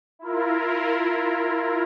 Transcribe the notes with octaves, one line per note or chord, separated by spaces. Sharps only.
E4 F4 A#4